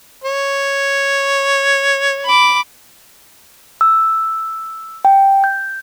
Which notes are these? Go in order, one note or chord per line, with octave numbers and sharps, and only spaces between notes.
C#5
B5 D6
E6
G5
G6